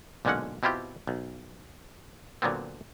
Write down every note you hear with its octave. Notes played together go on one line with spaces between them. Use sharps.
B1 A#2 D3 G#3 C#4 F#5
B2 C4 E4 F4 G4
B1
A#2 D3 F#3 B3 C4